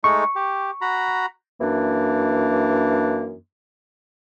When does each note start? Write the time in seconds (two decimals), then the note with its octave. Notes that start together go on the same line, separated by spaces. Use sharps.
0.04 G#3 A3 D#4 C#6
0.36 G4
0.81 F#4 A#5 B5
1.61 F#2 E3 A#3 D4